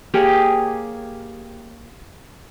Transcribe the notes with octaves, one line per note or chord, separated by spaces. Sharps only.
A#3 G4 G#4 C#5